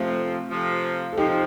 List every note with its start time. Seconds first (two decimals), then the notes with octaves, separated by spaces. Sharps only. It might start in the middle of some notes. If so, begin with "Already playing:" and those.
Already playing: F2 C3 F3 A3 C4
0.50 F2 C3 F3
1.13 A4
1.17 F2 C3 F3 D#4 G4